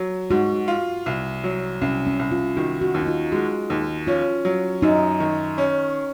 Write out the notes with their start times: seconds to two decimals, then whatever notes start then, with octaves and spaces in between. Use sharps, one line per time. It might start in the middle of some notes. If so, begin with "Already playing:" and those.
Already playing: F#3
0.30 G#2 F#4
0.68 F4
1.06 C2
1.44 F#3
1.81 C2 C#4
2.07 C#4
2.19 C2
2.31 F4
2.57 D#3 F#4
2.81 F#4
2.94 D#2
3.03 D#4
3.07 F4
3.32 G#3 F#4
3.70 D#2
4.07 C#4 F4
4.45 F#3
4.82 F#2 D#4
5.20 D#3
5.58 C#4